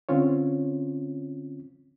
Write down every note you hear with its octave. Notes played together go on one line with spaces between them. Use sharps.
D3 C4 C#4 F4 C#5